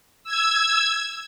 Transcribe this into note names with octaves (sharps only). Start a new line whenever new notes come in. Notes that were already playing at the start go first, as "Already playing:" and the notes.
E6 G#6